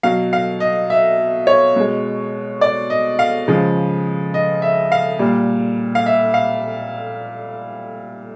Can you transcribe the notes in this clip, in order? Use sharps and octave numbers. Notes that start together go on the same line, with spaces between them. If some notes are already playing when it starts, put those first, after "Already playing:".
B2 F#3 F5
F5
D#5
E5
C#5
B2 G#3
D5
D#5
F5
C#3 F3 G#3
D#5
E5
F5
A#2 G3
F5
E5
F5